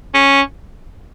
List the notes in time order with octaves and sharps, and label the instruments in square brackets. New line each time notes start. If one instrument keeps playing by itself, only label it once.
[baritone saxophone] C#4